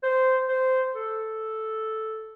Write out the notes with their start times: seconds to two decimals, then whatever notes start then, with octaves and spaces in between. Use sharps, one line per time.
0.03 C5
0.48 C5
0.94 A4